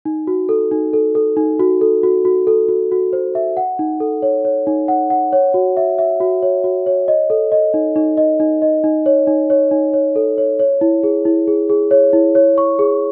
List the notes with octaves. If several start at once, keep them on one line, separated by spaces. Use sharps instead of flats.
D#4
F#4
A4
D#4
A4
A4
D#4
F#4
A4
F#4
F#4
A4
F#4
F#4
C5
E5
F#5
D#4
A4
C#5
C#5
D#4
F#5
F#5
C#5
F#4
E5
E5
F#4
C#5
F#4
C#5
D#5
A4
D#5
D#4
D#4
D#5
D#4
D#5
D#4
C#5
D#4
C#5
D#4
C#5
A4
C#5
C#5
E4
G#4
E4
G#4
G#4
C#5
E4
C#5
C#6
G#4